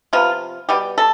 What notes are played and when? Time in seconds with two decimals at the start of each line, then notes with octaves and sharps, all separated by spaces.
0.13 C3 F3 B3 F4
0.69 B2 G3 B3 G4
0.98 A4